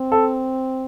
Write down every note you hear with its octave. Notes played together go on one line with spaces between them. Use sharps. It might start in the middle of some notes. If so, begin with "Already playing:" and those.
Already playing: C4
A4